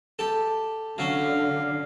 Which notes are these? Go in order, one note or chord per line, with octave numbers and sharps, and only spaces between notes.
G4 A4
D3 F#3 C#4 F5